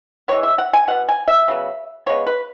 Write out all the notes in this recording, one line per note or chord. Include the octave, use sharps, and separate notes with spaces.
E3 G#3 B3 C#5
E5
F#5
G#5
B2 B3 F#5
G#5
E5
C#3 F#3 B3
C#3 G#3 B3 C#5
B4